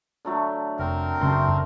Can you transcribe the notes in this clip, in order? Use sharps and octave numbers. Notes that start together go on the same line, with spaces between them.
D3 F#3 A3
F1 C4 A#4
F#1 F#2 C#3 A3 C#4 C5 C6